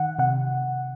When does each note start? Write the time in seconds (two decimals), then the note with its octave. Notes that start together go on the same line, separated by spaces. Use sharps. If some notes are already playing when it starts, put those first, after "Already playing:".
Already playing: D#3 F#5
0.19 C3 F#5